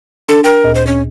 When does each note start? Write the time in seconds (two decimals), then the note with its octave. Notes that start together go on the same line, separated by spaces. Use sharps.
0.29 D4 A4
0.44 A#4 G5
0.64 D2 A#2
0.75 C5
0.87 C#4